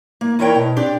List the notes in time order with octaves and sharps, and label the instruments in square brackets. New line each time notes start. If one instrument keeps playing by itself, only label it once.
[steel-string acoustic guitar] A#3
E2 E4 A#4 C#5 F#5 G5
B2
C4 D4 G4 D5